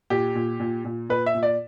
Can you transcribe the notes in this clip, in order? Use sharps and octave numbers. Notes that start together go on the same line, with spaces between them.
A#2 G4
A#2
A#2
A#2
A#2 B4
E5
A#2
D5